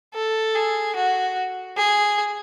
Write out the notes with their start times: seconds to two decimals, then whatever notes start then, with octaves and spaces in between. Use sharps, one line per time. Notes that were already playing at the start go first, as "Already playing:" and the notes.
0.14 A4
0.56 G#4
0.96 F#4
1.77 G#4